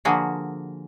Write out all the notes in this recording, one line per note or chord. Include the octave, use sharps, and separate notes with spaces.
D3 F3 A#3 F#4 G#4